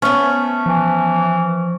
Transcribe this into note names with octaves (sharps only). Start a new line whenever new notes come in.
A3 B3 C#4
E3 F3